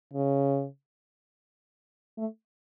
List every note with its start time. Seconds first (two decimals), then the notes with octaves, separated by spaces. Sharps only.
0.14 C#3
2.17 A3